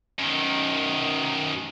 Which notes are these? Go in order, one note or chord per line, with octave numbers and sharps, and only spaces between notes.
F#2 D#3